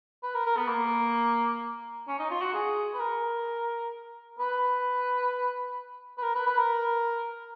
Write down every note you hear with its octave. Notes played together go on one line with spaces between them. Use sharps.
B4
A#4
A#4
B3
A#3
C#4
D#4
F4
F#4
G#4
B4
A#4
B4
B4
A#4
B4
B4
A#4